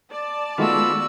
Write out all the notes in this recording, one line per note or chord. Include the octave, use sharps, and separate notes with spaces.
D5 A5
D#3 G#3 A3 B3 F4 F#4 E6